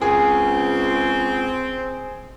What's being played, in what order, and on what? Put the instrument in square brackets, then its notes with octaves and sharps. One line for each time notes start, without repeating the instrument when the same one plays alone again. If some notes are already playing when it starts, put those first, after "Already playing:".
[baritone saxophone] C#2 [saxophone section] C4 [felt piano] G#4